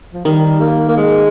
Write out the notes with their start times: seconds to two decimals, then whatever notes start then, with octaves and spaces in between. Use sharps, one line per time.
0.14 F3
0.25 D#3 G3
0.60 A#3
0.89 A#3
0.97 G#3